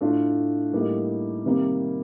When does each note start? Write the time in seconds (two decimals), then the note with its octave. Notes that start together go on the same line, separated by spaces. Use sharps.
0.01 A2 A3 D4 F4
0.73 A2 G3 A#3 D#4
1.44 C3 D#3 G3 A#3